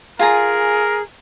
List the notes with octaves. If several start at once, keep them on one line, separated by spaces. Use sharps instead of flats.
F4 G#4 A#4 G#5 A#5